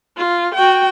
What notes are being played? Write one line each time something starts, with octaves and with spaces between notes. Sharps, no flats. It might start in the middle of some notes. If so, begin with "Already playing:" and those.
F4
F#4 G5